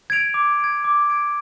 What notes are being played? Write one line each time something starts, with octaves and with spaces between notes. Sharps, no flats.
G#6 D7 F7
D6
G#6 D7
D6
G#6 D7